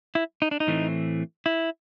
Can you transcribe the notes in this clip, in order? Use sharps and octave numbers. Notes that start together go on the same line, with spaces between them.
E4
D#4
D4
D#4
A2 E3 A3 C4
E4